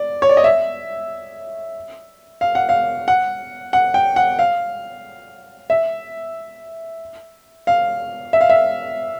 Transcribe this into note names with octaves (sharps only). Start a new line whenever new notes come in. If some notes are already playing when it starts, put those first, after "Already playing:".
Already playing: D5
C#5
D5
D#5
E5
F5
F#5
F5
F#5
F#5
G5
F#5
F5
E5
F5
E5
F5
E5